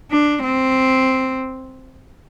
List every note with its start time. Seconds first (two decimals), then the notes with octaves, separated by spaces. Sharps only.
0.11 D4
0.44 C4